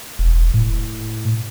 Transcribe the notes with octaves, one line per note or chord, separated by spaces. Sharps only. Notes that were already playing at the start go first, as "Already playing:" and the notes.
E1
A2